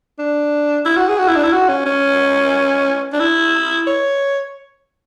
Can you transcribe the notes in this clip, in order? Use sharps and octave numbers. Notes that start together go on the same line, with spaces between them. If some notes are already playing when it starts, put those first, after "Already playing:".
D4
E4
F#4
G#4
F#4
E4
D4
E4
F#4
C#4
C#4
D4
E4
C#5